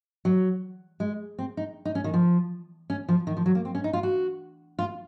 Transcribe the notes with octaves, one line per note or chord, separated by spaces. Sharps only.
F#3
G#3
C4
D#4
D#4
C#4
D#3
F3
C#4
F3
D#3
F3
F#3
A#3
C4
C#4
D#4
F4
F#4
F4